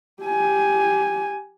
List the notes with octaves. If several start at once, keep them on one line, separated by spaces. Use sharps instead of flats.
G4 G#5